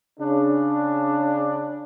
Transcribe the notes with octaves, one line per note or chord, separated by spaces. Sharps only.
C#3 D4